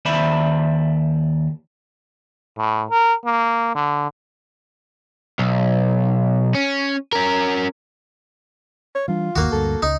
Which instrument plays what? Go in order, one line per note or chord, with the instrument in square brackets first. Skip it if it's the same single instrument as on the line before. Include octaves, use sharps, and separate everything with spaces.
[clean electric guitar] D#2 C5 D5 E5 B5
[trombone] A2
A#4
A#3
D3
[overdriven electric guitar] B1
C#4
C#4 A#4
[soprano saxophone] C#5
[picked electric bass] E3 G3 D4 [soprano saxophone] F4
[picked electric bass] G1 D#2 D#3 [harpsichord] A#3 F#4
[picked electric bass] D2 G2 [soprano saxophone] A4
[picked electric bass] C#2 [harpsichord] D#4